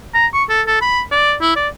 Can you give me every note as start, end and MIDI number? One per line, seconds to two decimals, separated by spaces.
0.14 0.26 82
0.33 0.44 85
0.49 0.62 69
0.67 0.80 69
0.82 1.02 83
1.11 1.34 74
1.41 1.53 64
1.56 1.68 74